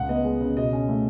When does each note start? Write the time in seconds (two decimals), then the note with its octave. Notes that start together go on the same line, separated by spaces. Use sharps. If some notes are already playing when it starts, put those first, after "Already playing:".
Already playing: C#2 F#5
0.09 B3 D#5
0.24 G#3
0.41 C#3
0.56 B2 D#5
0.73 C#4
0.88 A3